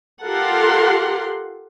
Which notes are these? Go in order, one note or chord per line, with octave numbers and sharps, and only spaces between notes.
F4 G4 A4 A#4 F#5 C6